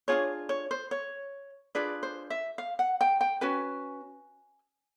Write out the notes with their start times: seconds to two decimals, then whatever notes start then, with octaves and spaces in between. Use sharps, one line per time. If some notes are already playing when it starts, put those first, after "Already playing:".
0.08 D4 F4 G#4 C#5
0.49 C#5
0.71 C5
0.91 C#5
1.75 D4 F4 G#4 B4 D5
2.03 C5
2.30 E5
2.58 F5
2.79 F#5
3.01 G5
3.21 G5
3.41 C#4 F#4 B4 G#5